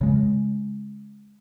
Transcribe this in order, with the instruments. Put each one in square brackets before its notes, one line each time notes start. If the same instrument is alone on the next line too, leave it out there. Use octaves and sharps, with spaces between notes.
[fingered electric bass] C#3 G#3